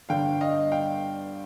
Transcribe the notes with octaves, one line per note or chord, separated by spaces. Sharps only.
G1 G2 D3 F5 G5
D#5 F5
F5 G5